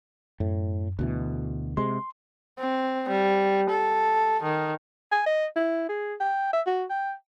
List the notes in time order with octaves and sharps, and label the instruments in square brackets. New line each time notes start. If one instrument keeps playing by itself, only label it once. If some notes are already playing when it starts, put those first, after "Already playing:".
[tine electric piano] F#2 [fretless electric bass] A2
[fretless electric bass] D2 B2 E3 [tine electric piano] A3
[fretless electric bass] C3 G#3 [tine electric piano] C6
[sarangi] C4
G3
A4
D#3
[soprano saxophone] G#5
D#5
E4
G#4
G5
E5
F#4
G5